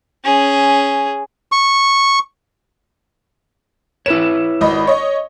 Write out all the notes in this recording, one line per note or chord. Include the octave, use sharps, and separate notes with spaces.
C#4 G#4
C#6
E4 B4 C#5 E7
G#1 D#5 B5
C#5 D#5